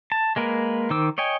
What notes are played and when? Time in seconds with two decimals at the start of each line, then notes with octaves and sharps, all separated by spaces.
0.12 A5
0.36 G#3 A#3 A#4 B4
0.90 D#3 C5 D6 E6
1.18 C#5 D#5 G5 G#5